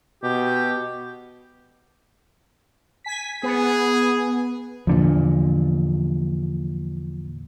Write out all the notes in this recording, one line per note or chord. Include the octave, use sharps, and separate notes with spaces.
B2 G4
G#5 B6
B3 G#4
E2 A#2 D3 F3